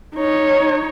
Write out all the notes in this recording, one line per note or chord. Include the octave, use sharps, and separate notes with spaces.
D#4 C#5